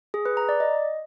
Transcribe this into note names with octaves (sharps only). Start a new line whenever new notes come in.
G#4
B4
A#5
D5
D#5